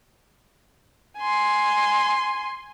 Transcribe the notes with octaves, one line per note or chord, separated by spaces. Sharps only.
G#5 C6